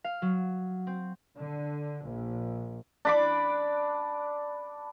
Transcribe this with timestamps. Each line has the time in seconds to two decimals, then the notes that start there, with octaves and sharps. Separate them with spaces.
0.04 F5
0.22 F#3
0.87 C4
1.38 D3
2.07 A#1
3.05 D4 B5 D6